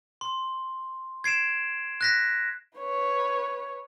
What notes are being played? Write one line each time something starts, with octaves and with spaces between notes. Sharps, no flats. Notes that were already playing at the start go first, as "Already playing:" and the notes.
C6
G#6 C7 D7 E7
F#6 A#6 B6
B4 C#5